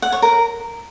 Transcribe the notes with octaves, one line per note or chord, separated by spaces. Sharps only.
F#5
C#5
A#4